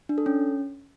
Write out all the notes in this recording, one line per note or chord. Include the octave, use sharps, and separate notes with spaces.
D4
A4
C#4